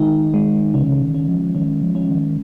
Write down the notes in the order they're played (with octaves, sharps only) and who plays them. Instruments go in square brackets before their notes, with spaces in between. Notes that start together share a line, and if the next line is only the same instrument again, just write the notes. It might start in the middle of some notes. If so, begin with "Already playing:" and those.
Already playing: [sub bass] D#3 [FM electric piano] G#3 D#4
[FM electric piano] G#3
[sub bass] C#3 [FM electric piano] C#4
[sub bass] D#3
C#3
D#3
[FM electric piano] C#4
[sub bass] F3
[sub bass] D#3 [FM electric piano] C#4
[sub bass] F3
[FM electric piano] C#4
[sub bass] D#3